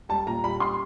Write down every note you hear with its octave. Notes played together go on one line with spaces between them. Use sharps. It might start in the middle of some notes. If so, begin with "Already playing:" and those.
G3 A5
A#2 A#5
G3 B5
G3 C6